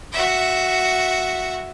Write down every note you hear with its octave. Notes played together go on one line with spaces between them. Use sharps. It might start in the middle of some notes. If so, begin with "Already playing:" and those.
F#4 E5